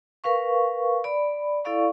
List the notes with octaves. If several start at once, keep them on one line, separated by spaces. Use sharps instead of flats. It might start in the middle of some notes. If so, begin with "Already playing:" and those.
A#4 B4 F5 C#6
D5 B5
E4 A4 D5 F5 C#6